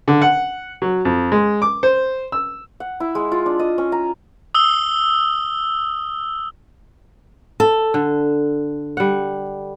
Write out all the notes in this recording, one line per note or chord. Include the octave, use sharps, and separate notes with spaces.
D3
F#5
F#3
F2
G#3
D6
C5
E6
F#5
E4
G#3
F4
D4
D#5
C#4
A#5
D#6 E6 G7
A4
D3
G3 F#5